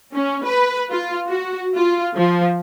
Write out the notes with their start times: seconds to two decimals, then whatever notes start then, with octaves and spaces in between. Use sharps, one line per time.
0.13 C#4
0.45 B4
0.92 F4
1.29 F#4
1.76 F4
2.15 F3